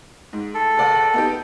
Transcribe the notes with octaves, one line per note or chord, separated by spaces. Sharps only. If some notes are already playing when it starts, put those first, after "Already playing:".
G#2
A4
F#1 D5 F#5
B3 D#4 G4